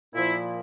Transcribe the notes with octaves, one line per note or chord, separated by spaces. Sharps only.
A#2 F3 E4